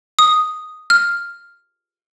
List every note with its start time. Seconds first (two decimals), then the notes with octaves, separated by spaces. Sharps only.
0.19 D#6
0.90 F6